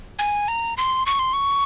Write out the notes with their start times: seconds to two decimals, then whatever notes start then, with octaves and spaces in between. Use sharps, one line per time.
0.19 G#5
0.48 A#5
0.77 C6
1.06 C#6
1.19 C6
1.33 C#6